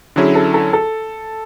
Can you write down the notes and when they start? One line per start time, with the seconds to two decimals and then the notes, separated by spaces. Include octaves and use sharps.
0.16 D3 F#3 C#4 E4 G#4
0.35 A4
0.54 A4
0.73 A4